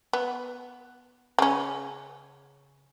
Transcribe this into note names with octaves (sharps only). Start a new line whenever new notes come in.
B3
C#3 C#4